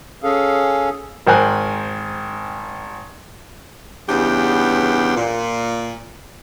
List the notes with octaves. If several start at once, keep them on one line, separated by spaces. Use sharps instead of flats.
C#4 G#4 A4 F5
G#1 A#4 C5 G5 G#5 F#6
E2 G2 C#3 B3 G4
A#2